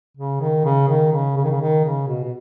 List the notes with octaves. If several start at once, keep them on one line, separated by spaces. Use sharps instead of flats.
C#3
D#3
C#3
D#3
C#3
C#3
D#3
C#3
D#3
C#3
B2
B2